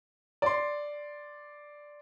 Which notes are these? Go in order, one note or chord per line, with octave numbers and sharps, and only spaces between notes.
D5 C6